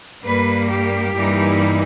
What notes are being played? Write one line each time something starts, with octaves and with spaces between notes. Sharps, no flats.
G2 G3 A#3 B4
G4
G2 E3 G3 A#3 D#4